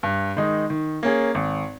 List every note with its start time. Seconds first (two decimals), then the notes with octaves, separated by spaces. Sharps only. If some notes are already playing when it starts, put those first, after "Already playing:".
0.03 G2
0.37 D#3 G#3 D#4
0.70 D#3
1.03 A#3 C#4 G#4
1.35 G#1